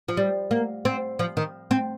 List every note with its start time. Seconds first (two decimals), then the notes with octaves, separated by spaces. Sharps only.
0.08 F3
0.17 G3
0.51 A#3
0.85 C4
1.19 F3
1.37 D#3
1.71 C4